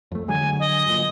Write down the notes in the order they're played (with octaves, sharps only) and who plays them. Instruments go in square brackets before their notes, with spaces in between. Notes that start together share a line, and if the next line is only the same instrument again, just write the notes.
[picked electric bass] F2 A3
[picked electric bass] D3 F#3 G#3 [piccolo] G#5
[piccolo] D#5
[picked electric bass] G1 A#2